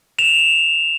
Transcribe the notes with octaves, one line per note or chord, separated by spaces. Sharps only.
E7 F7